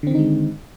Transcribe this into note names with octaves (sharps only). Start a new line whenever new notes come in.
D3 D#3 G#3 C4 D#4